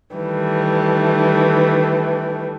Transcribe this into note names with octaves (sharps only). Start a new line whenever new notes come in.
D#3 E3 G3 A3